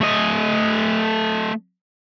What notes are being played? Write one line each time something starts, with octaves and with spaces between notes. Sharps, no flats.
A3 D#5